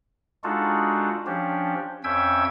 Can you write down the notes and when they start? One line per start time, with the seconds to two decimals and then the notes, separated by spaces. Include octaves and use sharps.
0.44 G#3 D4 D#4 F4 F#4 A4
1.26 F3 C#4 D4 G4
2.04 F2 C#4 E5 G5 E6 G#6